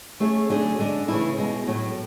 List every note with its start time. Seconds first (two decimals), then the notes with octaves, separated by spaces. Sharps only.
0.20 A3 C#4 G#4 C#5 E5
0.50 D3 F#3 A3 D4 G#4
0.79 D3 G#3 D4
1.08 C#3 E3 A3 E4
1.37 B2 G#3 B3
1.67 A2 F#3 A3